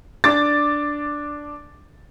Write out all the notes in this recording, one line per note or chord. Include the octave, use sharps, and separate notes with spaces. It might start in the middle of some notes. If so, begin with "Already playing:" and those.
D4 D6 A6